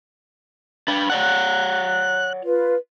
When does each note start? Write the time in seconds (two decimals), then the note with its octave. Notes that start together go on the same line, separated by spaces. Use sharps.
0.88 D4 B4 B5
1.10 C#5 D5 F#5 F#6
2.43 F4 B4